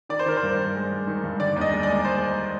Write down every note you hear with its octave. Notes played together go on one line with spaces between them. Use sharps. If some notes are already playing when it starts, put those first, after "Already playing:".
D#3 D5
C5
D#3 A#4
C5
G2
G2
G#3
G#3
D#3
G2
D3 D5
D#2
D#5
G#3
G#3 D5
C5